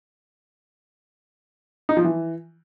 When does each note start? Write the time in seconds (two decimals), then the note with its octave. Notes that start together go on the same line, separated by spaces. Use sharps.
1.89 D#4
1.97 F3
2.05 E3